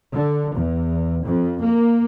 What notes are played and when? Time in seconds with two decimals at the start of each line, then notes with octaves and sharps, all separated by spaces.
0.13 D3
0.54 E2
1.23 F2
1.61 A#3